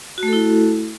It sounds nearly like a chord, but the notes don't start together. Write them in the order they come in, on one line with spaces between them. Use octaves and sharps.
F#4 A3 A4 E4